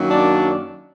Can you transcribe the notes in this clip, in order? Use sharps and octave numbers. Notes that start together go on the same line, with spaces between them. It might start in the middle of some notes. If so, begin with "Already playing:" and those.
Already playing: F#2 D#3 F#3 A#3
D4 D5